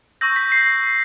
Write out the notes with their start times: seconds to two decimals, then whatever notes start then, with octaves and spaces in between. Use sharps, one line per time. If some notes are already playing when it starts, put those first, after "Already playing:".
0.21 C#6 E6 G6 A#6
0.36 B6
0.52 C7